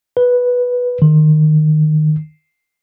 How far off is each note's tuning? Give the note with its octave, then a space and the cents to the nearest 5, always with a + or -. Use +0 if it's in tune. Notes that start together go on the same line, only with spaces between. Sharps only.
B4 -5
D#3 -20